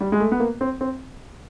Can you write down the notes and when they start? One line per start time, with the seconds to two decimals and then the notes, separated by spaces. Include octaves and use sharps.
0.01 G3
0.12 G#3
0.20 A3
0.32 B3
0.40 A#3
0.61 C4
0.81 C4